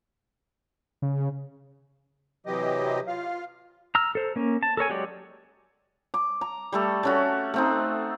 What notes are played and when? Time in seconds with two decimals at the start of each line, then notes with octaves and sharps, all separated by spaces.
1.02 C#3
2.46 C3 E3 F#3 G4 D#5
3.07 F4 F5
3.95 A#5 E6 F6
4.15 A4 C5
4.36 A#3 C#4
4.63 A5
4.77 A4 A#4 C#5 G#5
4.90 F#3 G#3 G4 C#5 D5
6.14 D6
6.41 A#5
6.72 G3 A3 A4
7.03 A3 C#4 F#4
7.54 A3 C4 D#4